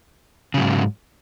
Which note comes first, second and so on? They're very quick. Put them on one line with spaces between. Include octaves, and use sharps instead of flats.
C#3 F#3 G#2